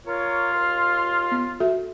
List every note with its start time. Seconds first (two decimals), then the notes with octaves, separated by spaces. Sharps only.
0.06 F4 A#4 C#5
0.53 D#2 C6 F6
1.31 B3
1.60 F#4 A4 E5